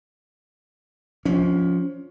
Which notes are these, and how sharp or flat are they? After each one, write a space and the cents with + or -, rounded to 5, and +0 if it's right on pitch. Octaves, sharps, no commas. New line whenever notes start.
F3 +15 C#4 +25